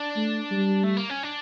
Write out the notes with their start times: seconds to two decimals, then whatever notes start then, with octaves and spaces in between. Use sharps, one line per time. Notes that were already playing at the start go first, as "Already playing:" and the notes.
Already playing: D4
0.16 A3
0.51 G3
0.84 A3
0.97 A#3
1.10 C#4
1.23 D4